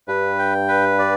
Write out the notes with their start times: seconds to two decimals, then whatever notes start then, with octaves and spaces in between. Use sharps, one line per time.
0.08 G2 B4
0.39 G5
0.68 B4
0.99 D5